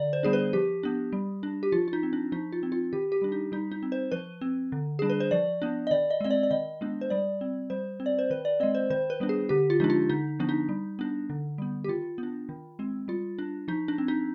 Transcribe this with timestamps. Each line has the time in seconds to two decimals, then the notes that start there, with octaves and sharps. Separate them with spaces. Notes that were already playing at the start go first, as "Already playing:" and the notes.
Already playing: D3 D5
0.13 C5
0.23 G3 B3 D4 G#4
0.33 B4
0.53 F3 G4
0.83 B3 D4
1.13 G3
1.43 D4
1.63 G4
1.72 F3 F4
1.88 F4
1.93 D#4
2.03 C4
2.13 D4
2.32 F3 D#4
2.52 F4
2.63 C4
2.72 F4
2.93 D#3 G4
3.12 G4
3.22 G3 D4
3.32 D#4
3.52 G3 D#4
3.71 D#4
3.83 C4
3.92 C5
4.12 F3 B4
4.41 C4
4.72 D3
4.99 G3 D4 G#4
5.10 B4
5.20 C5
5.31 F3 D5
5.62 B3 D4
5.87 D#5
5.91 D#3 D5
6.10 D#5
6.21 G#3 C4 D#5
6.31 D5
6.43 D5
6.51 D#3 D#5
6.81 G#3 B3 D4
7.01 C5
7.10 G3 D5
7.41 C4
7.70 G3 C5
8.00 C4
8.06 D5
8.19 C5
8.30 D#3 B4
8.45 D5
8.60 G#3 C4 D#5
8.75 C5
8.90 D#3 C5
9.10 B4
9.20 G3 B3 D4
9.29 G#4
9.49 D3 G4
9.70 F4
9.80 F3 G#3 D4 D#4
9.90 F4
10.10 D3 D#4
10.39 F3 B3 D4
10.49 D#4
10.69 G3
10.99 B3 D4
11.30 D3
11.58 G3 B3
11.84 G4
11.88 D#3 F4
12.18 B3 D4
12.49 D#3
12.79 G#3 C4
13.08 G3 F4
13.38 D4
13.68 F3 D#4
13.88 D4
13.98 C4
14.08 D#4